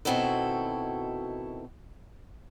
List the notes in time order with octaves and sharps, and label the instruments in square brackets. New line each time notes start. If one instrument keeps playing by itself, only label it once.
[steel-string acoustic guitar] B2 D#3 C4 E4 F#4 A4